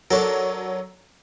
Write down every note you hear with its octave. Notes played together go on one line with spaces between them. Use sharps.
F#3 D4 A4 A#4 C#5